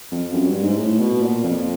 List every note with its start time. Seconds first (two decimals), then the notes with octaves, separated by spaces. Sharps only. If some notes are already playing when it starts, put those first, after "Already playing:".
0.11 F2
0.33 F#2
0.48 G2
0.63 G#2
0.77 A2
0.99 B2
1.21 A#2
1.43 F2